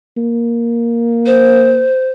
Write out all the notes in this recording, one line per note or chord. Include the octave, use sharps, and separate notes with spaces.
A#3
C5